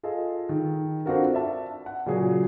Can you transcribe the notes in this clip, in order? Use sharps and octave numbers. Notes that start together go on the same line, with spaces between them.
F4 G#4 A4 D#5
D#3
C4 D4 F4 F#4 A4 A#4
D5 E5 A5
F#5
A#2 C#3 F#3 G#4